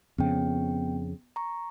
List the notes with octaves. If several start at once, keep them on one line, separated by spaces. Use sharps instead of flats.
F2 C#3 B3 G5
A#5 C#6